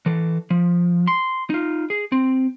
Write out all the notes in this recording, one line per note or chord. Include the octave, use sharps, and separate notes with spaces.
E3 A4
F3
C6
D#4 F4
G#4
C4